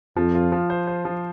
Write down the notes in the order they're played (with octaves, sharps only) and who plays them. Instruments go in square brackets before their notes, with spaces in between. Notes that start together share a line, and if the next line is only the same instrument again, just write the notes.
[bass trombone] F2 [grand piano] F3
[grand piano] F4
F3
C5
C5
F3